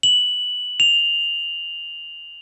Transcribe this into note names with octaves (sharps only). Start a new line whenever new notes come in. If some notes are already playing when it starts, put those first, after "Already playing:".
F#7
F7